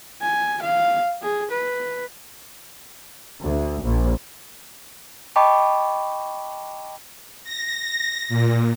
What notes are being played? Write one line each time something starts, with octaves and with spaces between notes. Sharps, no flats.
G#5
F5
G#4
B4
D2
A#1
D#5 G5 A5 B5 C#6 D6
A#6
A#2